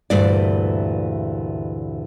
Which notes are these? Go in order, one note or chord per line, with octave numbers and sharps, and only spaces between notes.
D2 G2 A#2 E3 D5